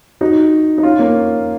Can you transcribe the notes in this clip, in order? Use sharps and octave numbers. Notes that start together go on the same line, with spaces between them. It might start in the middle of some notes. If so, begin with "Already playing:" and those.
D#4 F#4
D#4
C#4 F4
A#3 C#4